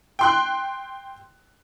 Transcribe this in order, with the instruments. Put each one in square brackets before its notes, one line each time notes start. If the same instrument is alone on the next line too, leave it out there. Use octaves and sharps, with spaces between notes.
[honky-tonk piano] G5 C6 F#6